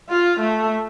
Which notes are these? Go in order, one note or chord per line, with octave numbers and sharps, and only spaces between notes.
F4
A3